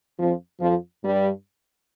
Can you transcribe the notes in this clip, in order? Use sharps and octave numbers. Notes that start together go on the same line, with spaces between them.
F2 F3
F2 F3
G2 G3